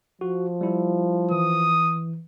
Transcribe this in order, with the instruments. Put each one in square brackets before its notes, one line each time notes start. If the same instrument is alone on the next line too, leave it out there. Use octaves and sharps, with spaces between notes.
[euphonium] F3 [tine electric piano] F#4
[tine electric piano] G3 E4
[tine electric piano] E3 [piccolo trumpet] D#6